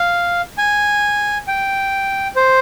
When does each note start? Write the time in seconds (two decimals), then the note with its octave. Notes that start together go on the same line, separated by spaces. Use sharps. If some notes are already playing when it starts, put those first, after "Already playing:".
Already playing: F5
0.58 G#5
1.48 G5
2.36 C5